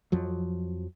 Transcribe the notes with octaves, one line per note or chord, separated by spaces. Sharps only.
F2 F3 F#3